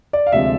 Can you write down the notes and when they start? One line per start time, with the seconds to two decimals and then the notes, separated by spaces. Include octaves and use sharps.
0.13 D5
0.27 F5
0.32 D2 C3 F3 G#3 C4 E5